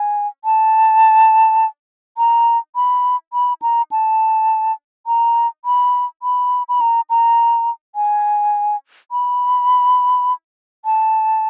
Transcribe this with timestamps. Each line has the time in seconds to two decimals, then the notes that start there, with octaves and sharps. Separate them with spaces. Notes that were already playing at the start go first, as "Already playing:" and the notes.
Already playing: G#5
0.45 A5
2.18 A#5
2.76 B5
3.33 B5
3.62 A#5
3.92 A5
5.07 A#5
5.65 B5
6.23 B5
6.69 B5
6.81 A#5
7.10 A#5
7.95 G#5
9.12 B5
10.85 A5